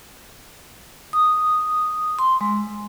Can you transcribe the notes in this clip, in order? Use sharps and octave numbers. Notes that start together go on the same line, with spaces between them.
D#6
C6
G#3